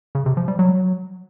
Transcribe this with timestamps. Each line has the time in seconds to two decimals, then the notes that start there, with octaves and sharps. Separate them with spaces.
0.15 C#3
0.26 C3
0.37 F3
0.48 G3
0.59 F#3